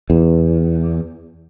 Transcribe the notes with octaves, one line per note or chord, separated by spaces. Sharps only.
E2